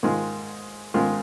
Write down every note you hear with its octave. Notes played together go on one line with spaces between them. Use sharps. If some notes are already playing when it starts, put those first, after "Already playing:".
G#2 D#3 G#3 F4
G#2 D#3 G#3 F4